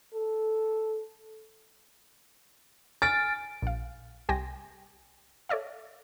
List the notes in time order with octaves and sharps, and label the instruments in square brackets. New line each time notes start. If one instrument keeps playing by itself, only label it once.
[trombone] A4
[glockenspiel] G#5 F6 D7 [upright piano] A6
[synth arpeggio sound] A#1 F5
C2 G4 G5 G#5 C6 A#6
A4 C#5 D5 E5 F5